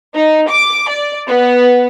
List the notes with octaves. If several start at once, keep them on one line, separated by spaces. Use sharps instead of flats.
D#4
D6
D5
B3